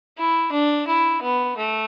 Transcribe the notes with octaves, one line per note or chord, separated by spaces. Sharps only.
E4
D4
E4
B3
A3